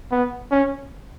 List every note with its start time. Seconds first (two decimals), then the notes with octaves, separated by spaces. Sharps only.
0.12 B3
0.52 C#4